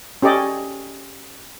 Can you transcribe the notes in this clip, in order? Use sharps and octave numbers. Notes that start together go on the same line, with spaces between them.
C#4 G4 A4 D5 D#5